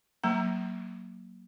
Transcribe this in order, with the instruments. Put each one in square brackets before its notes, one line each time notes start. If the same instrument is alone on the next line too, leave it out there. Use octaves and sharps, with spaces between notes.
[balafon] F#3 A#3 A#5